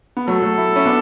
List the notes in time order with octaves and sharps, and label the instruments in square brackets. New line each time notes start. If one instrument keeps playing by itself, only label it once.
[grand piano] B3
[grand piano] F#3 A3 [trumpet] A4
[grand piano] F#3 A3
E4
C#4 E4
B3 D4